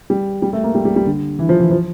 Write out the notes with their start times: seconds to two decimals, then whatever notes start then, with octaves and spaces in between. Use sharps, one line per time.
0.10 G3
0.42 G3
0.53 A3
0.64 A#3
0.75 G3
0.85 G3
0.96 G3
1.06 D3
1.39 E3
1.49 F3
1.60 E3
1.71 F3